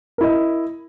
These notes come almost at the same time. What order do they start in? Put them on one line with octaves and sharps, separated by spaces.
A#4 E4 D#5